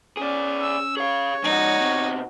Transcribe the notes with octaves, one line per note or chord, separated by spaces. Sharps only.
C#4 G#4 D5
E6
G#4 C#5 F5
F3 G#3 D#4 F#4
B2 C4